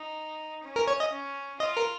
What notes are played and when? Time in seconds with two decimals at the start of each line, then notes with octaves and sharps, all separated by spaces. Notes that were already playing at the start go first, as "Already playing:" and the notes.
Already playing: D#4
0.63 C#4
0.76 A#4
0.88 C#5
1.00 D#5
1.11 C#4
1.60 F4 D#5
1.77 A#4